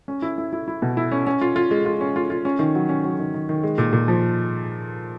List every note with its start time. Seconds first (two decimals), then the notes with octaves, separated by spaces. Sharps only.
0.08 C#4
0.22 E4
0.38 E4
0.53 E4
0.68 E4
0.82 B2
0.97 E4
1.12 C#4
1.27 C#4
1.41 F4
1.56 F4
1.71 G#3
1.86 F4
2.01 C#4
2.16 F4
2.30 F4
2.45 C#4
2.59 D#3
2.75 F#3
2.89 C#4
3.04 F#3
3.19 D#3
3.34 D#3
3.49 D#3
3.63 G#3
3.78 A#2
3.93 A#2
4.08 F3